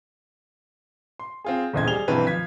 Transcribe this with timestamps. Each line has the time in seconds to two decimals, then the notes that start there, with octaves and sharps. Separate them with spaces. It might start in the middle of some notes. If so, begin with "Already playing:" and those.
1.19 C6
1.45 C4 F4 G#4
1.73 D#1 E2 C#3 C5 D#5 G#6
1.88 G3 G#4 F7 G7
2.08 B1 G2 E3 C4 B4
2.27 F3 G#6 B6